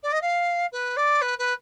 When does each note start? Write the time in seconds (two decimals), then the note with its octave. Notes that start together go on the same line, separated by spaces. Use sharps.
0.03 D5
0.12 D#5
0.21 F5
0.72 B4
0.96 D5
1.21 B4
1.38 B4